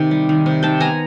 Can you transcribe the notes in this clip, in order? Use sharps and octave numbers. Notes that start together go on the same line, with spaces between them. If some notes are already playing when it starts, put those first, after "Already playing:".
Already playing: C3 D#3 G5
G3
D#3
C3
D#3 G5 A5
B3 G#5 A#5